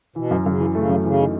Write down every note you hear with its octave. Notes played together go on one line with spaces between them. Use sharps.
B2 E3
F#2
F#2 C#3
E3
C#3 A3
F#2
C#3 E3
D#4